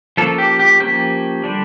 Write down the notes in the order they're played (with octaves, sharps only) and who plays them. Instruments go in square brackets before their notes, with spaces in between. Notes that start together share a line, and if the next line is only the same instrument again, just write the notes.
[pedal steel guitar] F3 A#3 C#4 A4
G4
G4
F3 A#3 C#4 G4
D3 G3 D4